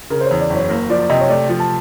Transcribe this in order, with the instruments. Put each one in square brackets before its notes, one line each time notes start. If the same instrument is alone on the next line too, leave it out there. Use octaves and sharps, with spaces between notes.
[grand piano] C#3 [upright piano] A#4
[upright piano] C5
C#5
[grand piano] E2
[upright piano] D5
[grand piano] F#1
[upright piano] C#5
[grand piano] A#3
[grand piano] F3 [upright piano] D5
[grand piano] C3 [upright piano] D#5
[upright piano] C#5
[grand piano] A3 [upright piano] D5
[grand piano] F3
[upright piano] A5